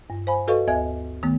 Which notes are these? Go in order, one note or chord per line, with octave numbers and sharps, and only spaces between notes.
G2
C5 F5 G#5 B5
F#4 A4 B4 D#5 F5 C#6
D2 D#5 E5 G#5 G#6
D#3 A3 B3